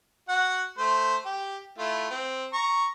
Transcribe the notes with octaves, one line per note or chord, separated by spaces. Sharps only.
F#4 F#5
A3 C5
G4
A3 E4 F4
C4
A#5 C#6